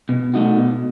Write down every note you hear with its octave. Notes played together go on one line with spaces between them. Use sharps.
B2
A3 C4 D#4 F#4
B2